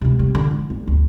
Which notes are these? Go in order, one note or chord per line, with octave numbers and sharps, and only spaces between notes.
C#2 C3
C3 G3
D3
G#3
G1
D2